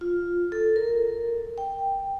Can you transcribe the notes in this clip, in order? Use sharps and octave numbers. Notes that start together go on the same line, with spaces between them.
F4
A4
A#4
G5